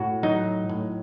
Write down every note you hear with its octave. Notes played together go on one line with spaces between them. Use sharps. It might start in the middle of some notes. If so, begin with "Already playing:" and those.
Already playing: A2 F#4
F#3 D#4
A2